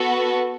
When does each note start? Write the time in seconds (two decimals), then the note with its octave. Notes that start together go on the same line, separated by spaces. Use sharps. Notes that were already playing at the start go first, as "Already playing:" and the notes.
Already playing: B3 F#4 A4